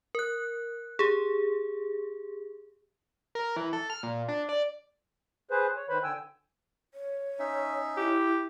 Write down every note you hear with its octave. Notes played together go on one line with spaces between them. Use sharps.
A#4 F#6
G4 G#4
A#4
E3
A4
F6
A#2
D4
D5
G#4 B4 C5
C#5
D#3 B4 C5 B5
D3 G5 G#5 E6
C#5
C#4 D#4 E5
E4 G4